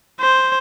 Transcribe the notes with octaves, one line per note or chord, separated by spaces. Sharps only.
C5